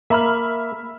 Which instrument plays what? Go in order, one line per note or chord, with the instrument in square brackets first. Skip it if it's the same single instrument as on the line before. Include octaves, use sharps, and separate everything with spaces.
[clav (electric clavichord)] A#3 [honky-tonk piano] E5 B5 F6